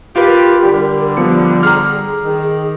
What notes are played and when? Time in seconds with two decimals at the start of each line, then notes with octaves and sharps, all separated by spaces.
0.16 F4 G4 A#4 B4
0.63 D3 G3 G4
1.17 F3 B3 C#7
1.63 G#4 A#5 D6 F6
2.24 D#3